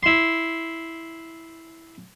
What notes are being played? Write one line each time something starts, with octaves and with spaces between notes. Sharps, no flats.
E4 C6